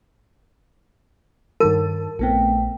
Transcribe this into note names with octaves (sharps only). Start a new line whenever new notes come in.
G2 D#3 A#4 A5
A#1 A3 B3 C4 G5